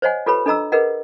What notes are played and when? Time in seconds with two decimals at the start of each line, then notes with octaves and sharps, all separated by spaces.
0.02 C5 C#5 D#5 F#5 G#5
0.26 F4 G4 A4 B4 C#5 B5
0.46 D4 A4 D#5 A#5 E6
0.72 G#4 A#4 B4 D#5 F#5